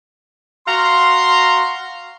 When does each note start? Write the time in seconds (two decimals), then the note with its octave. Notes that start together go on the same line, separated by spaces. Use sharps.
0.67 F#4 F5 A#5 C6